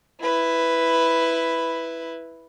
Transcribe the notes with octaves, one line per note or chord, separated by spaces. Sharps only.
E4 B4